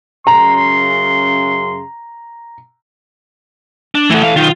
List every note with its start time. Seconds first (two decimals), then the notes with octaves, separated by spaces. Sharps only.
0.27 F#2 C#3 A#5 C6
3.95 D4
4.10 E3 A3 A4 F#5
4.23 F5
4.36 B1 D#3 F4